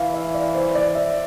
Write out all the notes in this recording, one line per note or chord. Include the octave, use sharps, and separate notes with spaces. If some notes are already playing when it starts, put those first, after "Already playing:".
Already playing: E3 E5 F5
E5
D5
C5
D5
E5